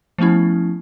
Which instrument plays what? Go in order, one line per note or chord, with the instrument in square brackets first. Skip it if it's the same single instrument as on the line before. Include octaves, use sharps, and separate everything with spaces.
[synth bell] F3 A3 B3 C#4 E4